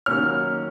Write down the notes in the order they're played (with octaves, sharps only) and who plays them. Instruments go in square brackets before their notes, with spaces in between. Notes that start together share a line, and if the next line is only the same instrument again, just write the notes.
[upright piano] D#3 F#3 A#3 C#4 F6